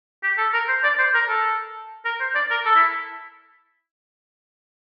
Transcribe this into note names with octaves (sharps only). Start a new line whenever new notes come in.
G4
A4
A#4
C5
D5
C5
A#4
A4
A#4
C5
D5
A#4
A4
E4